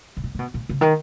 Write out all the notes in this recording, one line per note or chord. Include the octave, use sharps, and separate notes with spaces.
B2
A#2
C#3
B2
A#2
C#3
D#3